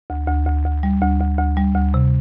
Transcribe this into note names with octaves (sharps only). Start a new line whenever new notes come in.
D2
D2
D2
D2
G3
D2
D2
D2
G3
D2
C3